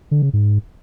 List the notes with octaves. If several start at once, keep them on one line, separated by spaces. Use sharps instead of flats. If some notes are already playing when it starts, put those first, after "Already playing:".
D3
C#3
G#2